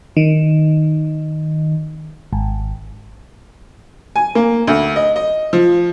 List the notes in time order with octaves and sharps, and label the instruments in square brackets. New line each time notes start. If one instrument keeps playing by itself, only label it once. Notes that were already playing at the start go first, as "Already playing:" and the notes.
[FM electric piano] D#3
G#1
[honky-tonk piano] G#5
A#3
D2
D#5
D#5
F3